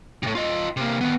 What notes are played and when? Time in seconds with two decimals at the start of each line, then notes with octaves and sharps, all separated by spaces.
0.23 A2 C3
0.35 F4 D#5
0.77 C3 A#3
1.01 D#3 B3